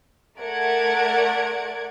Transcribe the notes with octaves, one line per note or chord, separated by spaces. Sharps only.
A3 A#4 D5 F#5 G#6 D7